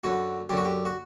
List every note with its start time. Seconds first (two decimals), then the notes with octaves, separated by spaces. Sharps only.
0.04 F#2 D3 F#4
0.49 F#2 D3 G4
0.57 F#4
0.65 G4
0.85 F#4